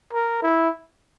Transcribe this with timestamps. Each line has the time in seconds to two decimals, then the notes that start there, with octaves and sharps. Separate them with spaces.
0.13 A#4
0.42 E4